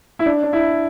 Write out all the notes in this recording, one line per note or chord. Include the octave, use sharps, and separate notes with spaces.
E4
D4
D4
E4